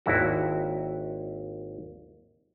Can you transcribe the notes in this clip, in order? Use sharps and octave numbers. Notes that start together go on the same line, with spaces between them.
G#1 D#2 E4 F#4